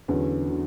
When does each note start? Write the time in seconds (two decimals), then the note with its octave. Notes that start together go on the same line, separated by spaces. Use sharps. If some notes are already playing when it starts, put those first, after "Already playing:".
0.08 E2 D3 F#3 C#4
0.48 D3 F#3